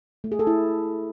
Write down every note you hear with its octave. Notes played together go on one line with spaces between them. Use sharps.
A3
G#4
A4
E4